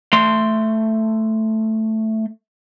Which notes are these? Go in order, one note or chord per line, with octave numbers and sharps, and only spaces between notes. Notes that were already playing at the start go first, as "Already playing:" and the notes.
A3 C6